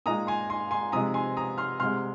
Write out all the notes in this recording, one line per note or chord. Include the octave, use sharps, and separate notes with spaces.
A#2 G#3 D#4 A#5 D#6
G#5 C6
G#5 C6
G#5 C6
C3 F3 G#3 D#4 A#5 D#6
G#5 C6
A#5 D#6
C6 F6
C2 C3 G#3 C6 F6